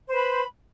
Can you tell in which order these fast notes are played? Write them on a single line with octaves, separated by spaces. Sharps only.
C5 B4 B5